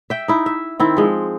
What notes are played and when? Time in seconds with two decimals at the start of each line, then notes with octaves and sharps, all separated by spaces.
0.10 E5 G5
0.28 D#4 E4
0.46 E5
0.80 D#3 C4 E4
0.97 F3 G#3